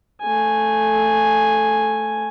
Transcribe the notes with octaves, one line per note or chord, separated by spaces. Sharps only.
A3 G#5